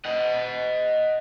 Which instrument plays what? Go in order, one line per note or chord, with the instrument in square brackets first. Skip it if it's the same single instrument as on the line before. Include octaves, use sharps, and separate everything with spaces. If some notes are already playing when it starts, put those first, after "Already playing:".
[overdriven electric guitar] D#5 F#5